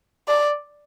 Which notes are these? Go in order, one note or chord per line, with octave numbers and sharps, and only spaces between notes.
D5